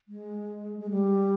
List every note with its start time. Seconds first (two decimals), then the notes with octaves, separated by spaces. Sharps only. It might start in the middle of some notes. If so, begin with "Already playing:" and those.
0.08 G#3
0.79 G#3
0.91 G3